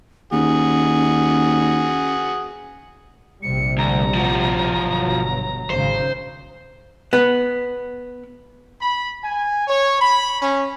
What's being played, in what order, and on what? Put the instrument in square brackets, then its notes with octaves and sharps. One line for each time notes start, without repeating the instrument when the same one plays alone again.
[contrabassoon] D#2 [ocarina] C#4 [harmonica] F#4 G#4
[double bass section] A#1 C3 G3 [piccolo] C#7
[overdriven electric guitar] D2 [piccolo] A#5
[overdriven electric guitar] F3 F#4
[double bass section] G1 B2 F#3
[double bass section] G#1 C#3 [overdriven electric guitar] C5
[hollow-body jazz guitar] B3
[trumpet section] B5
G#5
C#5
B5
C#4